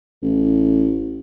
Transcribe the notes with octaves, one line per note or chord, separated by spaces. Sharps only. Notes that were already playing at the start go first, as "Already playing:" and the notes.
A1